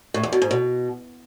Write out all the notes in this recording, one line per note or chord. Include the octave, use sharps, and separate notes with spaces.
A2
E2
B2
G#2
B2